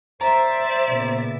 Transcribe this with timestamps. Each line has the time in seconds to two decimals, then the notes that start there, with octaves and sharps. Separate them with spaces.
0.21 C5 D5 E5 A#5
0.87 A#2 C#3 B3